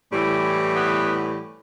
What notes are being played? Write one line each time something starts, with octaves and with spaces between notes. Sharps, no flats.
A2 E3 G3
B3